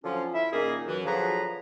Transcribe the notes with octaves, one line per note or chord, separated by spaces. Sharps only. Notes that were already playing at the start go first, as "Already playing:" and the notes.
D3 F3 F#3 C#4 F4
E4 E5
A#2 D#3 A#3 C#4 D#4 G#4
F#2 E3
D3 F3 F#3 G#4 B4 A#5